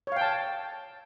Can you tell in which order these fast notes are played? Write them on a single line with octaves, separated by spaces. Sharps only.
C#5 F5 G5 A5